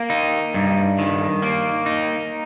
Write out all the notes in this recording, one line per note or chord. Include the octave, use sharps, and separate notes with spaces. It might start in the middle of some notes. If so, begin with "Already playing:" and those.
Already playing: A#3
D#4
G2
D#3
A#3
D#4